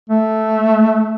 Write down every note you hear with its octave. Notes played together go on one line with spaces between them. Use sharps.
A3